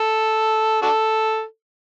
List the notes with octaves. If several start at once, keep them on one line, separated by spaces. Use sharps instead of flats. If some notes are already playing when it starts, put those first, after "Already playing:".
Already playing: A4
D4 F#4 A4